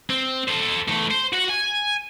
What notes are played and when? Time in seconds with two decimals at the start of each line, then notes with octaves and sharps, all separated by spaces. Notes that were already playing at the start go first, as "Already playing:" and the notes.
0.10 C4
0.48 A4 C5
0.88 E2 A3
1.11 C5
1.33 F#4 F#5
1.49 G#5